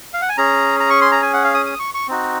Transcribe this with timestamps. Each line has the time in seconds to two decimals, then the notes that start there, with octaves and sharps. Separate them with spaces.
0.14 F5
0.22 F#5
0.29 G#5
0.37 C#4 G#4 A#5
0.80 A#5
0.90 C#6
1.01 C6
1.12 A#5
1.22 G#5
1.34 F#5
1.44 F5
1.54 D#6
1.66 D#6
1.79 C#6
1.94 C#6
2.08 C4 D#4 F#4